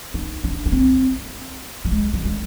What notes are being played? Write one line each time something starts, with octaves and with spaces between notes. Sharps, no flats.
D#4
D4
C#4
C4
G3
G#3
G3
G#3